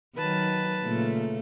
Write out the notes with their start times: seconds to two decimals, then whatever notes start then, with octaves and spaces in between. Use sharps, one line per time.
0.16 D#3 F#3 B4 A5
0.82 A#2 C#3 A3